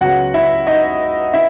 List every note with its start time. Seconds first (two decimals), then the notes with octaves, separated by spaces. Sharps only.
0.01 C#2 C#3 F#3 B3 F#4 F#5
0.34 E4 E5
0.67 D#4 D#5
1.33 E4 E5